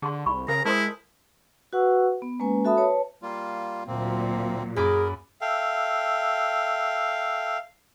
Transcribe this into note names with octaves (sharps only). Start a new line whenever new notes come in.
D3 G#4 A5 C6
C2 B5 C#6
C#3 G#4 A#4 F5 A#5
G#3 E4 A#4 C5 A5 C6 D#6
F#4 B4 F#5 C#6 E6
B3
G#3 A#3 C#4 B4 G#5
F#4 A4 E5 A5 B5 D#6
B4 C#5 A5
G3 A#3 F4
D2 A#2 F#3 A#3 C4
F#2 G#4 A#4 B5 D6
A4 E5 F5 G5